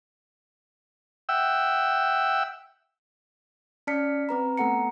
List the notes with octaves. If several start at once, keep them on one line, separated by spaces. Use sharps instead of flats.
E5 F#5 G5 E6
C#4 D5 A5 F6 B6 C#7
C4 B4 A#5
A3 B3 A4 F#5 A#5 C#7